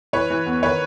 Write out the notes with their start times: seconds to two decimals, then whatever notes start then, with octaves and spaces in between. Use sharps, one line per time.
0.13 E3 B4 C#5
0.30 E3
0.46 E2
0.63 D#3 B4 C#5